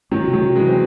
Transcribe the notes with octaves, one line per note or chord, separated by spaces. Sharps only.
D#3 F#3 C#4
C3
D#3 F#3
C#4
E3 G#3
F#3
C4